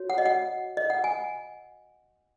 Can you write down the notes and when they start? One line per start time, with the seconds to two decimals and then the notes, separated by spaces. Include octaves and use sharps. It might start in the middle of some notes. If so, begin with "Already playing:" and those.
Already playing: F#4 C#5
0.10 F#5
0.18 D#5
0.25 F#5
0.77 D#5
0.90 F#5
1.04 G#5